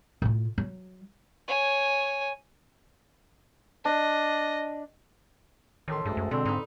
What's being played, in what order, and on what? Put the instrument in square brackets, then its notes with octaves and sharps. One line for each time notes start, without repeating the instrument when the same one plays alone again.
[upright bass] A2 F4
F#3
[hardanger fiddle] C#5 G#5
[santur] D4 [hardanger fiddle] D#5
[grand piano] A1 A4 C6 [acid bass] D#3
[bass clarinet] D2 [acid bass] G2 [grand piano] G#3 A4
[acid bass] F#2
[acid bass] B2 [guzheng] D3 [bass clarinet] C4
[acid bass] G#2 [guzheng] D#4 B4